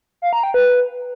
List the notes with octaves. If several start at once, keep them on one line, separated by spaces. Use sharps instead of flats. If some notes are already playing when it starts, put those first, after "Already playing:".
F5
A#5
G5
B4